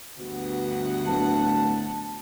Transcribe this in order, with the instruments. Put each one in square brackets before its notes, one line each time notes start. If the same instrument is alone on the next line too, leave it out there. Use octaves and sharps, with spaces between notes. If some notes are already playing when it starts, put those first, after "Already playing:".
[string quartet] D2 F#5 [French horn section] G2 B3 F#4
[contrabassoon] D1 [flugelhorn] A5